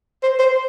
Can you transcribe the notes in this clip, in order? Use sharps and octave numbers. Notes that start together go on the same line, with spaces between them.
C5
C5